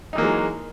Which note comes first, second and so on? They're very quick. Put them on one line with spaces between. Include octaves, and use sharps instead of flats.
D#4 E3 A#3 F#3 G#3